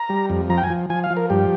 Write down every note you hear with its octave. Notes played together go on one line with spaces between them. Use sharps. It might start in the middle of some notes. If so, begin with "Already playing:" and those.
Already playing: A#5
G3
F2
F3 A#5
G5
G#5
F3
F3 G#5
F5
F3
A#4
G2 G4